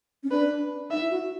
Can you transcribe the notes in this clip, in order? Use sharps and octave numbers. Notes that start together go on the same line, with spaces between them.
C#4
D4 B4
D#4 E5
E4
F#4